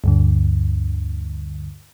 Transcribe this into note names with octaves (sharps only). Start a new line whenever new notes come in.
D2 G2 D3